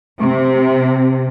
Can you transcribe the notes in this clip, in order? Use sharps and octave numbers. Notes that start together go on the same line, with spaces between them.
C3